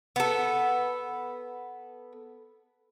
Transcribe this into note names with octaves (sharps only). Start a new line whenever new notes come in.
B3 A4